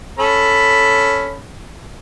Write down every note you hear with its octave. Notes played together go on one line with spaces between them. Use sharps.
C#4 A4 B5